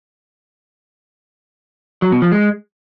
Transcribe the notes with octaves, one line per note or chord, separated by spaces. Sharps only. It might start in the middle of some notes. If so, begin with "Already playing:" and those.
F#3
B2
F3
G#3